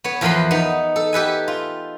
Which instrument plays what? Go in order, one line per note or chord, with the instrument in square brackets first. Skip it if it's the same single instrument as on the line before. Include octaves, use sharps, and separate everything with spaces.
[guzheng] B3 C#5
E2 F3 A#4 B4 B5 C6
B3 D#4
A4
G4 A4 B4 G#5
F4